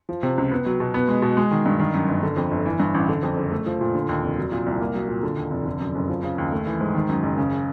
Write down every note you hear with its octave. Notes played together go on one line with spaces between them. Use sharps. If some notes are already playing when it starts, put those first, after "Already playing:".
F3
C3
C#2
B3
F#3
B2
B3
G#3
B2
G#3
D#3
G2
D#3
F#2
G1
D3
F2
G1
E3
G2
A1
D3
F2
F#1
A3
F3
A#2
D3
D#2
F1
F#3
A#2
C2
A#3
F#3
A#2
D3
D#2
F1
D3
F#2
F#1
F3
C#3
D#2
A3
E3
G#2
D#3
F#2
F#1
C#3